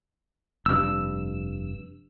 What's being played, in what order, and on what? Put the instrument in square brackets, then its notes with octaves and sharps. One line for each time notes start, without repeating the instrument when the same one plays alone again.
[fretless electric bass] F1 G2 [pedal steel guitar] E6